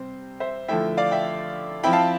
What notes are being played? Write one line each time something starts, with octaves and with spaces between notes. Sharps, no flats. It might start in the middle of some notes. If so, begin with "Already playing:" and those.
Already playing: C3 G3 C4 C5
C5 E5
D3 F3 A3 E4 E5 G5
D5 F5
E5 G5
F3 C4 E4 G5 B5
F5 A5